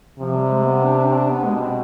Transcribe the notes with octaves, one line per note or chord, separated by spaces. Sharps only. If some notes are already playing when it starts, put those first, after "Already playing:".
C3 F3
G3
G#3
B3
D4
D4
C4
D4
B3
B2 G#3
D4
C4